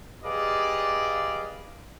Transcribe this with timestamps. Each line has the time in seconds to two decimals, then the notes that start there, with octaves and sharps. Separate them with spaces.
0.24 G4 G#4 B4 D5 D#5 F5